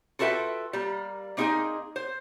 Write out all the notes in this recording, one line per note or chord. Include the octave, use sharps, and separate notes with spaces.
F4 F#4 A4 B4 E5 G5
G3 A#3
A#3 C4 D#4 G4 G#4 D#5
C5